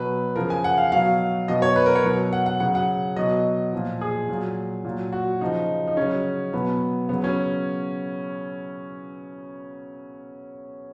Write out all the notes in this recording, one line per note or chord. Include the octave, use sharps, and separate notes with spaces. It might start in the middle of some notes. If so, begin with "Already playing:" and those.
Already playing: B2 F#3 B4
C#3 F3 A#4
G#5
F#5
F5
B2 F#3 F5
B2 F#3 D#5
C#5
B4
A#4
C#5
B2 F#3
F#5
F#5
C#3 F#3 F#5
F#5
B2 F#3 D#5
A#2 F3
G#4
A#2 F#3
A#2 F#3
F#4
C#3 F3 D#4
D#4
C#3 F#3 C#4
B2 F#3 B3
C#3 F#3 B3
C#4